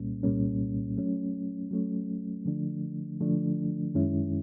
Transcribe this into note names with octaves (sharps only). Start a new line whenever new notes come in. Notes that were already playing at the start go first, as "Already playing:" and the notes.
Already playing: C2 A#2 G3 A#3 C#4
C2 A#2 G3 A#3 C#4
F#3 A3 C#4
F#3 A3 C#4
D3 F3 A3 D4
D3 F3 A3 D4
F#2 D#3 G#3 C#4 E4